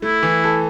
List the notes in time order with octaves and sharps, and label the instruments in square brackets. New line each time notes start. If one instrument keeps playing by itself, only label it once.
[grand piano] A3 [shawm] E4
[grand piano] E3
A4